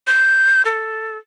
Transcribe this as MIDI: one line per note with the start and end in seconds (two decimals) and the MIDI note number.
0.07 0.62 91
0.65 1.18 69